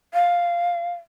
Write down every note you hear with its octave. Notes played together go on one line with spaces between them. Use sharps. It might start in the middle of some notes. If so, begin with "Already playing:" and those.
F5